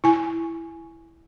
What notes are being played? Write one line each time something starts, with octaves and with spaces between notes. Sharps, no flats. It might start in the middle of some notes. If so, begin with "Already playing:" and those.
E4 G#5